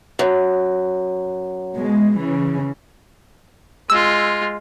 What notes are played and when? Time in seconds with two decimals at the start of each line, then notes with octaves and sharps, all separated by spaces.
0.19 F#2
1.76 B2 G#3
2.19 C#3 E3
3.90 G#3 F4 E6